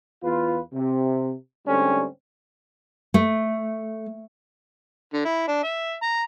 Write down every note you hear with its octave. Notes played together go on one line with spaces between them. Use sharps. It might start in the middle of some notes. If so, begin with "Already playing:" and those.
E2 F4 B4
C3
G#2 D3 G3 A3 C4 C#4
A3
D3
E4
D4
E5
A#5